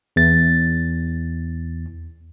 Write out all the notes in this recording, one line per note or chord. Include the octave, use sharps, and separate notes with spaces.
E2 A6